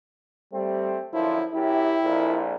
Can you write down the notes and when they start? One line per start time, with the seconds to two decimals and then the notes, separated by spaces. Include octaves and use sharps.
0.54 G3 A3 C4
1.13 F#2 D3 F3 E4
1.54 F#2 E4 G4
2.03 A#1 F2 A#2